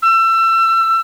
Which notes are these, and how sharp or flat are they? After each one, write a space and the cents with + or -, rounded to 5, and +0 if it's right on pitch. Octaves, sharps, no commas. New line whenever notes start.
E6 +30